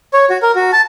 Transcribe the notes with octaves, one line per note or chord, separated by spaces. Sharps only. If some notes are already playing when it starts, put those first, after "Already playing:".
C#5
F#4
A#4
F#4
A5